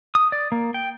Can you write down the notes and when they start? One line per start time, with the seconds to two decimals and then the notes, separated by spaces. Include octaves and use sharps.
0.15 D#6
0.32 D5
0.52 A#3
0.74 G5